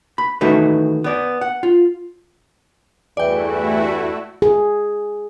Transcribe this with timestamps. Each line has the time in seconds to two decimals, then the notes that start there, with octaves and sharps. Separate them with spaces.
0.18 B5
0.41 D#3 E3 A3 D#4 F#4 B4
1.04 B3 D5
1.41 F#5
1.63 F4
3.17 E2 G2 E3 A3 E4 F#4 D5 G5
4.42 G#4